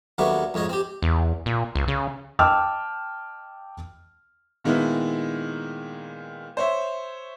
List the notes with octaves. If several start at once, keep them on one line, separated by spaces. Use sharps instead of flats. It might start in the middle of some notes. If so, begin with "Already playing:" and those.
D#2 F#3 A3 B3 D4 C#6
F2 G#2 C#5 D#5
C4 G4
E2
A#2
C#2
C#3
D#5 G5 A5 D6 E6 F6
A#2 D#3 G#3 B3 E4
C5 C#5 E5